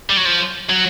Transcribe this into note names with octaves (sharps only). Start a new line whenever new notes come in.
G3
F#3
F3
F#3